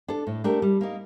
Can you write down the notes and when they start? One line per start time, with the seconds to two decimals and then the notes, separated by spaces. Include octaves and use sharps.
0.08 D4 A4
0.27 A2
0.44 A3 D4 G4 A#4
0.62 G3
0.81 A#3 D#4